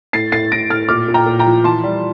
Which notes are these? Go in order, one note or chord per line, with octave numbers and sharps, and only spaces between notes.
A2 A6 C7
A2 A6 C7
A2 A#6 D7
A2 F6 A6
A#2 D6 F6
A#2
G5 A#5
A#2
G5 A#5
F3
E3 A5 C6
G3